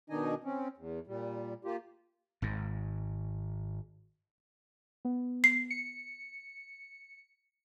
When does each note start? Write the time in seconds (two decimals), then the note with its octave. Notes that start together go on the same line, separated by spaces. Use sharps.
0.10 B2 D#3 D4 D#4 D#5 G#5
0.44 C4 C#4
0.77 E2
1.07 A#2 G3
1.65 A#3 F4 G4
2.42 G#1 G#2
5.05 B3
5.44 C7
5.70 C#7